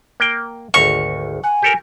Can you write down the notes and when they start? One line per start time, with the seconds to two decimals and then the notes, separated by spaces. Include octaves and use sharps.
0.20 A#3 G5
0.74 G#1 D2 A#5 C#6
1.44 F#5 G#5
1.63 G4 A4 A#4